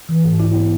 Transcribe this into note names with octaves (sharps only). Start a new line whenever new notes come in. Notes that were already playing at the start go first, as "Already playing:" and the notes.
E3
G#2
E4
B3